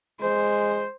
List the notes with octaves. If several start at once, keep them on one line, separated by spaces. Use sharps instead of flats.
G#3 C5